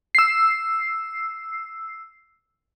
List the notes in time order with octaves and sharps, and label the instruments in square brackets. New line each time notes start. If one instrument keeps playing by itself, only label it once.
[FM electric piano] E6 C7